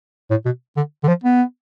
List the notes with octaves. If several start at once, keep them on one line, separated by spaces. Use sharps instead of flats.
A2
B2
D3
D3
F3
B3